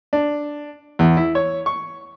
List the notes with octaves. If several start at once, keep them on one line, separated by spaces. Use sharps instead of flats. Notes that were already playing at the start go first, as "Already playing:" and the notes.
D4
E2
E4
C#5
C#6